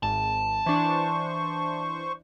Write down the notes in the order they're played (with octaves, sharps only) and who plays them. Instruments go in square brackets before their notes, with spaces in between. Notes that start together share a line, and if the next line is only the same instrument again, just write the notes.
[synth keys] G#1 [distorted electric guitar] A5
[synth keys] E3 D4 [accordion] C5 C#6